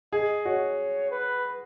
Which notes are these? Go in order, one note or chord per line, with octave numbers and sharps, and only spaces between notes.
G#4 D#5
F#4 C#5
B4